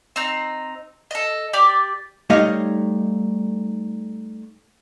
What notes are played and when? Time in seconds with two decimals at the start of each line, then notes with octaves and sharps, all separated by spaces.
0.16 C4 D#4
1.11 A4 D#5
1.53 G4 D5 D6
2.30 G3 A3 D#4 C#5 D#5 F5